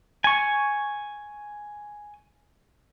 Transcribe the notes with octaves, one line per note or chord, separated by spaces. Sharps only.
G#5 C#6